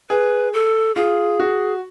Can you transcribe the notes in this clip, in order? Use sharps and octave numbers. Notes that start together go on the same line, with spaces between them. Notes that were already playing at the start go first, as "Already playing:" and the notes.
G#4 B4
A4
F4 G#4
F#4